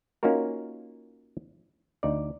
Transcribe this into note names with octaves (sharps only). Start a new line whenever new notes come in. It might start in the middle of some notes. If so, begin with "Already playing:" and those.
A#3 C#4 D#4 F4 F#4 A#4
D2 D#4 D5